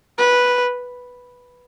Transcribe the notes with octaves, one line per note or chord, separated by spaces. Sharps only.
B4